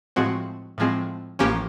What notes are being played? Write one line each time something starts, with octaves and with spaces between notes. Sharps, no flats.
A2 F3 G#3 C4 F#4
A2 F3 G#3 C4
A1 A2 F3 A#3 C#4 G4